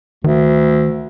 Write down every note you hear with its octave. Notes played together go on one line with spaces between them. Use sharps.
D2 D#3